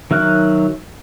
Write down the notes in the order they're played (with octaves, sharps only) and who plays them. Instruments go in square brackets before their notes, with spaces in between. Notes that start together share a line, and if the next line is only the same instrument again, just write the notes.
[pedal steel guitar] D#3 F#3 E5 F6 F#6